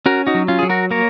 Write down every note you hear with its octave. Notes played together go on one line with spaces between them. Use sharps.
C#4 F#4 A#4
D#4 F#4
F#3
C#4 F4
F#3 G#4
F#4 A#4
A#3 A#4 C#5